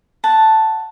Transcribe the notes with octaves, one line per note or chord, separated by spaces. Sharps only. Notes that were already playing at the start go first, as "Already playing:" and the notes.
F#5 A5